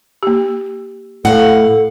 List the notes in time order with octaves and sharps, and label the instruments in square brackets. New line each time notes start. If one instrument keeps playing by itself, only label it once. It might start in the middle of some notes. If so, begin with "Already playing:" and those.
[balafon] A#3 G4
[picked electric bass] A2 [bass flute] A4 [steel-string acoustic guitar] F5 F#5